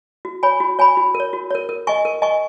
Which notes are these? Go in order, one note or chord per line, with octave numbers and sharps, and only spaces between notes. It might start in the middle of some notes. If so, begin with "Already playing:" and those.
F#4
C#5 G#5 B5
F#4
C#5 G#5 B5
F#4
A#4
C#5
F#4
A#4 C#5
A#4
D#5 G#5 C#6
A#4
D#5 G#5 C#6